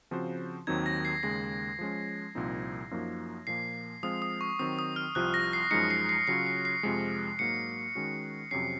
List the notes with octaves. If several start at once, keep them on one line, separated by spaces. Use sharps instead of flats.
C#3 F3 C4 F#4 C5
D#2 D#3 F#3 C4 D#4 G#6
A#6
C7
D#2 C#3 G#3 A#6
F3 G#3 C#4
C2 A#2 F3 C4 D#4
F#2 F3 A#3 D#4 F#4
A#2 F3 A#3 C7
F3 G#3 C4 F4 C5 D#6
D#6
C#6
D#3 F#3 C4 D#6
D#6
F6
C2 C3 F3 C4 F4 F#6
A#6
C7
F#2 F3 G#3 D#4 C#7
C7
C7
C#3 F#3 C#4 F4 C7
C7
C7
F2 C3 F3 G#3
G#2 F#3 A#3 C#7
D#3 G#3 C#4 F#4
F2 C3 F#3 C#4 C7